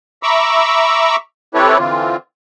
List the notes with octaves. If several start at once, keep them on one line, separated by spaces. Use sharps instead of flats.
E5 A#5 B5 C#6 D6 E6
C4 E4 G4 A4 B4 C#5
D3 E3 C4 F4